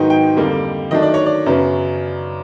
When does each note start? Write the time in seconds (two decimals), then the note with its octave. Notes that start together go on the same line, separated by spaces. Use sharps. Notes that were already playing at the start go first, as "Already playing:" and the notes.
Already playing: G#2 D#3 F#3 B3 D#4 G5
0.10 G5
0.37 F2 D3 G3 A#3
0.91 D#3 F#3 A3 D4 D#5
1.02 D5
1.14 C#5
1.26 D5
1.46 F#2 C#3 F#3 B3